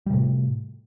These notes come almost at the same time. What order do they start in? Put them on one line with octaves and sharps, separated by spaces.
G3 C3 A2